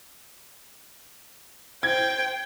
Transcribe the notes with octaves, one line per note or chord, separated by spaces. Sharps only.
C5 G5 G#6